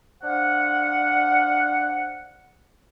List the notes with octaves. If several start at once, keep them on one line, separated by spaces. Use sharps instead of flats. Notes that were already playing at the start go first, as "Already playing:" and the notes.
D4 C5 F5 F#5